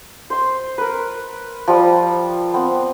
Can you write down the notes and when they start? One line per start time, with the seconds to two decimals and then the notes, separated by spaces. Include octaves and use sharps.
0.30 C5 C6
0.78 A#4 B4
1.68 F3 G3
2.54 B3 C4